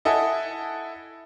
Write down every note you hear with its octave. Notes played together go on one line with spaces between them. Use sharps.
E4 A4 D#5 F#5 G#5